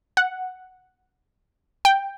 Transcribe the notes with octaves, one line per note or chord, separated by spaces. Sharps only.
F#5
G5